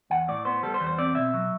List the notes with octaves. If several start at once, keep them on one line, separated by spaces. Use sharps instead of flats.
E2 F#5
A2 D5
B3 C5
G3 A4
C5
E2
C5
C4 D5
B2 E5
F#3